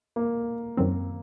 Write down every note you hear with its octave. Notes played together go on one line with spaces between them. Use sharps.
A#3
F#2 D#3 F#3 C4